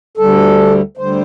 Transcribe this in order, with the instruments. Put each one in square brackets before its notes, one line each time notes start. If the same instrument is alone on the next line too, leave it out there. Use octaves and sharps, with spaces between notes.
[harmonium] D2 D3 G3 A4
D2 D3 G3 C5